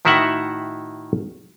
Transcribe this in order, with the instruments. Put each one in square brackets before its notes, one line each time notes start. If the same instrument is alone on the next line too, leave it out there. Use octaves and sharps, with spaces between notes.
[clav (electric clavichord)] A2 D#3 E4 F#4 E5 F#5